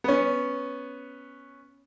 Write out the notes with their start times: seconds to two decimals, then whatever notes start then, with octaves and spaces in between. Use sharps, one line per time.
0.04 B3 C#4